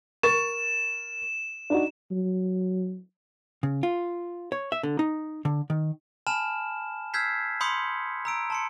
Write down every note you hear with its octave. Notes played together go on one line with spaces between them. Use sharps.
A#4 C#6 A6 E7
D4 D#4 F#4
F#3
C#3
F4
C#5
E5
D3
D#4
D3
D#3
G#5 A5 B5 F6 E7
E6 F6 G6 G#6 B6 C7
B5 C6 D#6 G6 C#7
A#5 E6 D7
A5 C6 C#7